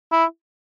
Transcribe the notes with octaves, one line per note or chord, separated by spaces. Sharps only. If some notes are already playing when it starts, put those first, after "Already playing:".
E4